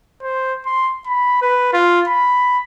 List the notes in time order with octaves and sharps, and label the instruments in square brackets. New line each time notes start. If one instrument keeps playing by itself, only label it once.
[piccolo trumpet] C5
C6
B5
B4
F4
B5